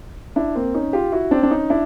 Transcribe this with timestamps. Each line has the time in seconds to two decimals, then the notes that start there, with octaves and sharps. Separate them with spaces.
0.36 D4 E4
0.55 A#3 C4
0.74 C#4 D#4
0.93 F4 G4
1.12 E4 F#4
1.31 C4 D4
1.43 D4
1.51 C#4 D#4
1.70 D4 E4